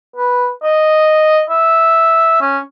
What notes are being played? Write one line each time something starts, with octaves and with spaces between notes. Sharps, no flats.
B4
D#5
E5
C#4